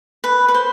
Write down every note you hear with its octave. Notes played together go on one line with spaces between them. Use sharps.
B4
B4
C5